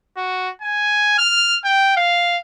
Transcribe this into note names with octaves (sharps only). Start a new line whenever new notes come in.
F#4
G#5
F6
G5
F5